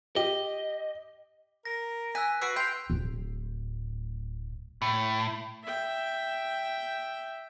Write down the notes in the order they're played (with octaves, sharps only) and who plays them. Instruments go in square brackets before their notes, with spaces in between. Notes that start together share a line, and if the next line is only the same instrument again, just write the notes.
[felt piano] G4 [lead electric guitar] D#5
[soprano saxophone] A#4 [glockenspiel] A#6
[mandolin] G#5 [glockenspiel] E6 F#6 B6
[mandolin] F#4 G#5 [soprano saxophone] B4 [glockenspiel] E6 C7 D7
[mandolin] G5 [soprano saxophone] C6 [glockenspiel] G6 F7
[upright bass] D1 A2
[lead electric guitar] A2
[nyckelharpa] E5 G5